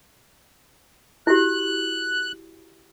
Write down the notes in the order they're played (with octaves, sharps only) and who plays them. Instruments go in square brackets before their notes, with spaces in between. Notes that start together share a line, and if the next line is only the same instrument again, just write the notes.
[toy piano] E4 F#4 G4 [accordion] F#6